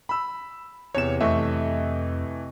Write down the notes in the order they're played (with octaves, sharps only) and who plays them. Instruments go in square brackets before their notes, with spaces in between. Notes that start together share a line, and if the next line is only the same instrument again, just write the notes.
[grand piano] B5 E6
[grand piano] E2 C3 [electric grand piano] C#5 E7
[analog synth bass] F2 [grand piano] C3 D#5 C#6 [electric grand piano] E3 A3 E5